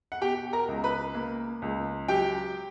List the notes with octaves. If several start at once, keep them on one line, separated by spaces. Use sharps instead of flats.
F#5
B2 G4 G5
A#4 A#5
C#2
B4 B5
A#3
C#2
F#3 G4 G5